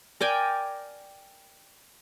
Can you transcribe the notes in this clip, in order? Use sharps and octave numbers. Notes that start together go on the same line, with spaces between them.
A#4 D5 G5 G#5